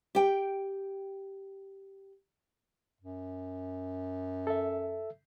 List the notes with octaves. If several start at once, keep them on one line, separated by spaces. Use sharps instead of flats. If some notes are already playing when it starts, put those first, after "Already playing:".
G4 G5
F#2
A4 E5